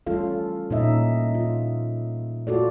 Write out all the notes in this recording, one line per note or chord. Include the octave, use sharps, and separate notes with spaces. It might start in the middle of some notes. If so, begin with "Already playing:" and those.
E3 G3 C#4 F4 A4 F5
A#2 C#4 D#4 D#5 E5
F4
F4 F#4 A4 D5